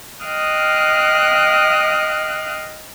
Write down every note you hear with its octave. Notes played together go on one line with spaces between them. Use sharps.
D#5 F5 G5 D#6 F6 F#6